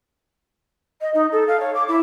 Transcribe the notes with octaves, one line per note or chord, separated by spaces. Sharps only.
D#5
D#4
A4
F5
C#5
D6
E4